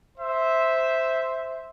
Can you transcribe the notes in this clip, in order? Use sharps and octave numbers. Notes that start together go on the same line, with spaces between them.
C5 E5